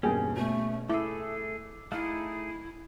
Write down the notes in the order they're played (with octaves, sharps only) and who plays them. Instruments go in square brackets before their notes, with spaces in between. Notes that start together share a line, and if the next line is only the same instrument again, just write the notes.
[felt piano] E2 G2 B2 [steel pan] A#3 G#4 G5 [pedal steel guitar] C#4
[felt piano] B2 [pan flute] A3
[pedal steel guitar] A3 G#4 [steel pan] E4 [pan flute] A4 [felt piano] D6 E6
[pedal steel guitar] A3 D#4 G#4 [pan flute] E4 [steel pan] F5